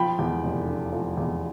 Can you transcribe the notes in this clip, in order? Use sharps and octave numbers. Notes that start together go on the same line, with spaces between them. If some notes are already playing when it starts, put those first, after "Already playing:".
Already playing: F3 G5 B5
E2
F1
D3
F3
E2